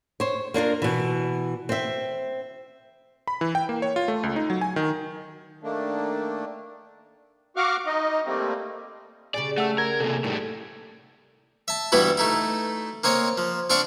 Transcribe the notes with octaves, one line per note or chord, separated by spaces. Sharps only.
C5 C#5
A#3 D4 F4 A#4
B2 E3
C4 E5
B5
E3
G5
A#3
C#5
F4
A3
C#2
D#4
F#3
G#5
D#3
D#3 A3 A#3 D4
F#4 F5 F#5 C#6 D6 F6
D#4 D#5
G3 A3 A#3 C4
C#3 G3 G#4 D5
A3 F#5 E6
A#4 G#6
C3 A#3 A4
A2 G3 D#4
E5 A5
G2 E3 G3 B3 E4 F#4
A3 D#4 E4
A#3 C4 C#5 D#5
F3
C4 D4 D5 F5 C#6